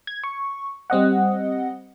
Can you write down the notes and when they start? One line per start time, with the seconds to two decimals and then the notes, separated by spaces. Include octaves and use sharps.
0.07 G#6
0.24 C#6
0.90 G3 C4 D#5 F#5